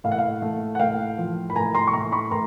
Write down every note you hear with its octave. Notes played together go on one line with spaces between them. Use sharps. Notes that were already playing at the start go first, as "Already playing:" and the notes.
A2 F5
F#5
F5
A3
F#5
A2 F5 G5
F3
B5
A2 G#5 A#5
A#5 C6
C#6
A2 A#5 C6
B5 C#6
A2 A#5 C6